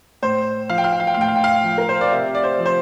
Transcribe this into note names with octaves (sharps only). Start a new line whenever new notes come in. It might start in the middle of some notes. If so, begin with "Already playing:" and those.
A2 C5
F3 F5
G5
F5
G5
F5
G5
F5
A2 G5
F5
G5
F5
F3
A#4
C5
D5
C3 E5
D5
C5
F3
C5